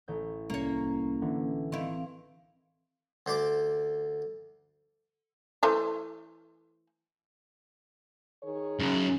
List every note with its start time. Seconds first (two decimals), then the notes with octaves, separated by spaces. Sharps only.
0.08 A1 G6
0.50 C2 A#3 C#4 C#5
1.22 D3 E3
1.72 D#3 C4 E4 F5
3.26 D2 C5 D5 C6 D6
5.63 E3 A3 C5
8.43 D#3 G#4 C#5
8.79 F#2 C#3